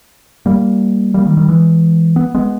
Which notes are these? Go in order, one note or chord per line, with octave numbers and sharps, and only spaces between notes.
G3 A#3
G3 A#3
D#3 G3
D#3 G3
E3 G#3
B3
G#3 B3